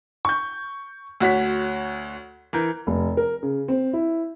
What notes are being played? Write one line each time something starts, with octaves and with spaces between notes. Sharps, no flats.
C#6 G6
D2 F#4 C#5 B6
E3 A#4 G6
F1
A#4
C#3
C4
E4